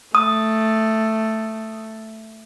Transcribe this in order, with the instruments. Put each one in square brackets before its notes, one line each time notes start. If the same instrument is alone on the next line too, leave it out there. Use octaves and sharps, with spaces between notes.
[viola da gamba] A3 [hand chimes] D#6